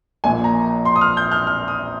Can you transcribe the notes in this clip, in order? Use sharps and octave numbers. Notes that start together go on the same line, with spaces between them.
A#1 A#2 G#5
A#5
C6
D#6
F6
G6
F6
F6
D#6